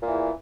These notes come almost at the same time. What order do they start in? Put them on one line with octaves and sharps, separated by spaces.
A#2 E3 E2